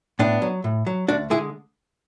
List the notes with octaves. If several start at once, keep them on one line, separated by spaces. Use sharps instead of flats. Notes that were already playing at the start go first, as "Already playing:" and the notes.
A2 B3 D4
F#3
A2
F#3
D2 D4 F#4
D3 G#3 E4 G#4